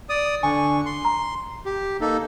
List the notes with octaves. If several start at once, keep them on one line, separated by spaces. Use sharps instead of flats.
D5 D#6
D3 G#5 C#6
C6
A#5
G4
A#3 D#4 A4